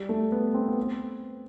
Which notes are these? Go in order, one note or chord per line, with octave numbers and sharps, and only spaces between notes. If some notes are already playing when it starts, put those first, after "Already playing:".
Already playing: G3
A3
B3
C4
B3
C4